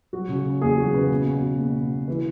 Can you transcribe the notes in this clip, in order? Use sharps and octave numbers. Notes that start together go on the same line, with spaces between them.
F#3 F#4
C#3
C#3
E2 G#4
F#3 F#4
C#3 B4
B2
B2
B2
B2
B2
B2
E3 B4